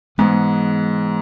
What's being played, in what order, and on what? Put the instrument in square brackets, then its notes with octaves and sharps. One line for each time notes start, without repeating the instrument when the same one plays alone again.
[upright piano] G#2 [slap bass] E3 G#3 B3